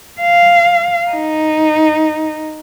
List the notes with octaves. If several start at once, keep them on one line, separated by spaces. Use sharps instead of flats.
F5
D#4